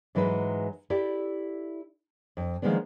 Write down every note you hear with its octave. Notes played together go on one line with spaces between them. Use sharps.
G#2 E3 F#3 G#3 B4
E4 G4 A4 D5
F2
D#3 F3 G#3 A#3 B3 D4